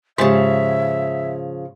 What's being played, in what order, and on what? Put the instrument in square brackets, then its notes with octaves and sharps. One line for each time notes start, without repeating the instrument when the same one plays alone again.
[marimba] G#2 G#3 G4 [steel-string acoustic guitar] C#3 F3 [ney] E5